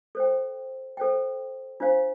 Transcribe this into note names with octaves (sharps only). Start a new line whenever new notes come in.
A4 C5 G5
A4 C5 G5
D4 F4 C5 F5